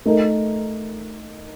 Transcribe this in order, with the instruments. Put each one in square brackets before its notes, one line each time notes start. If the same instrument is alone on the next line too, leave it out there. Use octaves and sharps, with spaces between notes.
[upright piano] A3 D#4 A#4